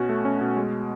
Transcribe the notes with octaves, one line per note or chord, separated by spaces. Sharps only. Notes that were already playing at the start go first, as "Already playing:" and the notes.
Already playing: B2 C#4 F#4
A3
C#4
B2
G#3